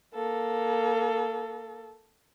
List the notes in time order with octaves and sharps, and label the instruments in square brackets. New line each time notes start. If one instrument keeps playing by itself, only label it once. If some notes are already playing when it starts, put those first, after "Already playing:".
[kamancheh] A#3 A4